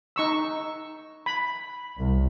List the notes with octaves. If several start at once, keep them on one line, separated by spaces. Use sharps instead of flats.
D#4 C#6 E6
B5
C2